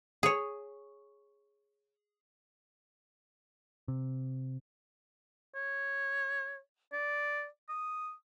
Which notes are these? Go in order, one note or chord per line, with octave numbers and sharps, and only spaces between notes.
G#4 C#5
C3
C#5
D5
D#6